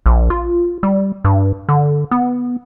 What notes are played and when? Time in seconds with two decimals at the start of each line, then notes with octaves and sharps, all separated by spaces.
0.06 A#1
0.30 F4
0.83 G3
1.24 G2
1.69 D3
2.11 B3